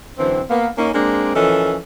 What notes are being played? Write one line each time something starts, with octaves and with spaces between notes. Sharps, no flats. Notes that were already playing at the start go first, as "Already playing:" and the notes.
F#2 D3 E3 C4
A#3 B3 F5
A#3 C#4 D#4
G#3 A#3 C4 D4
E3 F3 C#4 A4 A#4 D#5